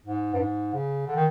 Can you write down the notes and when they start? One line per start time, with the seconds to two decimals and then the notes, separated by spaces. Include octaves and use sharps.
0.06 G#2
0.34 G2
0.39 G#2
0.73 C#3
1.07 D3
1.15 D#3